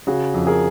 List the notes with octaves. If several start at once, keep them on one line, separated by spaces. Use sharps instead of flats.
C#3 F#4 G#4
F2
G#4 A#4